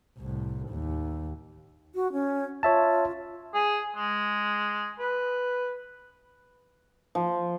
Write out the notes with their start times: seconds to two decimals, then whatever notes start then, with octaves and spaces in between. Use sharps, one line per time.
0.18 C2 A2
0.69 D#2
1.95 F#4
2.12 C#4
2.63 F4 C#5 E5 A5
3.54 G#4
3.96 G#3
4.99 B4
7.15 F3